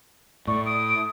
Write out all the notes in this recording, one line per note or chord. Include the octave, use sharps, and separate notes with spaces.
A2 D5 C#6
D#6 D7